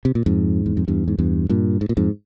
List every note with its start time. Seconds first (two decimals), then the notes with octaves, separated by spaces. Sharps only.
0.05 C3
0.15 A#2
0.26 F2 G#2
0.66 E2
0.77 F2
0.88 E2 G2
1.08 G#2
1.19 E2 G2
1.49 G2 A#2
1.81 G#2
1.89 A#2
1.97 F2 G#2